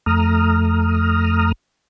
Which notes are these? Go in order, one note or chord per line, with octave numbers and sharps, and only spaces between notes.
F2 A3 A#5 D#6 F6